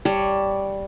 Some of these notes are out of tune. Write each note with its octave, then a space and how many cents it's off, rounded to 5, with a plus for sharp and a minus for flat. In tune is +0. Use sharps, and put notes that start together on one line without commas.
G3 +0 C#5 +10 A5 +15